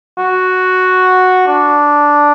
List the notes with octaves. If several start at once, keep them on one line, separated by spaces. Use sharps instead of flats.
F#4
D4